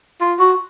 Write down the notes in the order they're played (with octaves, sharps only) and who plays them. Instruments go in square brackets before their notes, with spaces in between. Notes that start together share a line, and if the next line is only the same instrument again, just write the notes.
[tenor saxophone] F4
F#4